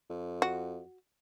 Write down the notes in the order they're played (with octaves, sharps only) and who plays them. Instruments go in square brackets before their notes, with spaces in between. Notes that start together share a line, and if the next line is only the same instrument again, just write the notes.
[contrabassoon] F2
[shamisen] F#4